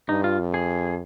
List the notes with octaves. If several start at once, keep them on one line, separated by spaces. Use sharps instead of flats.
G2 D#4
F4
F2
G#4